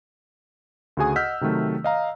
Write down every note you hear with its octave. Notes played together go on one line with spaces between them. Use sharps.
D2 C#3 F#4 G#4 G#5 D#6
D#5 F#5 E6 F6 G6 B6
C3 D#3 F#3 A3 C4
D#5 F5 A#5